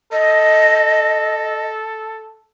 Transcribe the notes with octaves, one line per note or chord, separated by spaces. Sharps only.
A4 D#5